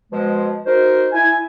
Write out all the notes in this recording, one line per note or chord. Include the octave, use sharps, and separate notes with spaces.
B2 F3 G#3
D#4 F#4 A#4 C5
E4 G#5